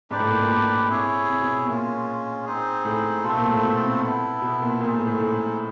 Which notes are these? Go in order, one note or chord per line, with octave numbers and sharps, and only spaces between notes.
G#2 D4 G4 B4 D5
A2
A#2
A#2
C3 E4 G#4 C#5
C3
B2
A#2 G#3 C#4 F4
C4 D#4 G#4
A2
B2 A3 C4 F4 A4
A#2
A2
B2
C3
B3 E4 A4
B2
A#2
A#2 C4 D#4 G#4
A2
A2
A2